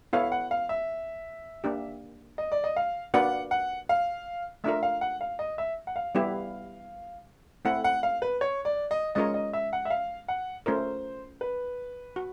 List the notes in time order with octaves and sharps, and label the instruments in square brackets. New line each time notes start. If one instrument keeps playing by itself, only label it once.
[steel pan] B3 E4 A4 C#5 [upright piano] F5
[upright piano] F#5
F5
E5
[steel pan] A#3 D4 G4
[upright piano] D#5
D5
D#5
F5
[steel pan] A#3 D4 F#4 B4 D5 [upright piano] F#5
[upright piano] F#5
F5
[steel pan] A3 D4 F4 A#4 [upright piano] E5
[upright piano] F5
F#5
F5
D#5
E5
F#5
F5
[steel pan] G3 B3 E4 G4
[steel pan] A3 C4 E4 A4 [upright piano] F#5
[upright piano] F#5
F5
B4
C#5
D5
D#5
[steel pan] G#3 C#4 F4 A#4 C#5 [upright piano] D#5
[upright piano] D#5
E5
F#5
E5
F5
F#5
[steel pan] A3 C#4 F4 A#4 [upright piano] C5
[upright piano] B4
[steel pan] F#4